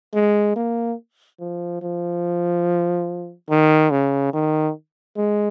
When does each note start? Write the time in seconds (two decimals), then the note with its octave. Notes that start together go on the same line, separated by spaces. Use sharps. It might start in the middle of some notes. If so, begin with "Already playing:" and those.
0.14 G#3
0.56 A#3
1.40 F3
1.82 F3
3.50 D#3
3.91 C#3
4.33 D#3
5.17 G#3